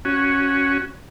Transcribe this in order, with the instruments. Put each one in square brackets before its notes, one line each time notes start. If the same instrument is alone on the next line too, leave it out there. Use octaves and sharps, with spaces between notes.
[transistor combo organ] C#4 F#4